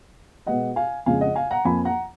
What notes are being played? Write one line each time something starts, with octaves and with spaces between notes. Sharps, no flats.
B2 G#3 B3 D#5 F#5
F5 G#5
F2 C#3 G#3 F5 G#5
D#5 F#5
F5 G#5
F#5 A#5
F2 F3 A#3 G#5 B5
F#5 A#5